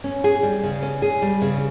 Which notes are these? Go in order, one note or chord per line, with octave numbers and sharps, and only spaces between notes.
C#4
G#4
G3
C#3
C#4
G#4
G3
C#3